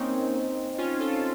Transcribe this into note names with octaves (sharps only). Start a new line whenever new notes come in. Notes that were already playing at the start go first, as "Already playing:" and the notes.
Already playing: A#3 C4 C#4 D#4
C#4 F4
F4 A4